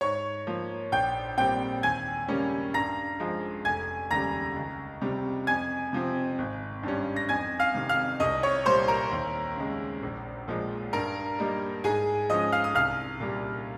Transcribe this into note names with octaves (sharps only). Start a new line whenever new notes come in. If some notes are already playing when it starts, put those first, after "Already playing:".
G#2 C#5 C#6
F3 A#3
A#1 G5 G6
A#2 G3 C4 G5 G6
D#2 G#5 G#6
C#3 G3 A#3 C#4
G2 A#5 A#6
F3 G#3
F1 G#5 G#6
D#2 C#3 G3 A#5 A#6
C#2
C3 G3
F2 G#5 G#6
C3 F3 C4
G#1
G2 G3 C#4
A#6
F2 G#5 G#6
F5 F6
C3 D#3
F5 F6
C2 D#5 D#6
C#5 C#6
A#2 G3 A#3 C5 C6
A#4 A#5
D#2
C#3 G#3
A#1
A#2 F3 G#3
G2 A#4 A#5
G3 A#3 D#4
G#2 G#4 G#5
F3 G#3 C#4 D#5 D#6
F5 F6
D#6
C2 F5 F6
A#2 G3